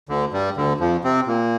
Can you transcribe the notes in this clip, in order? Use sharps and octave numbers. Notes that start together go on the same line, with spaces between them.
D2 D3
G2 G3
D2 D3
F2 F3
C3 C4
A#2 A#3